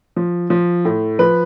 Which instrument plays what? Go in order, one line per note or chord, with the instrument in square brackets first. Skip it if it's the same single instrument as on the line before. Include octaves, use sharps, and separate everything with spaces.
[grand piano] F3
F3
A2
F3 B4